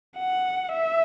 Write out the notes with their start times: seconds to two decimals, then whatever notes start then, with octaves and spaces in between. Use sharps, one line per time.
0.17 F#5
0.73 E5